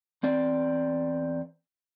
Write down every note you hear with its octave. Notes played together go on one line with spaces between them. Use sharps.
E2 C4 D5